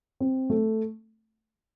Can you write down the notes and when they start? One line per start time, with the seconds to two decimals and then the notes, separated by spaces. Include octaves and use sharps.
0.20 C4
0.50 A3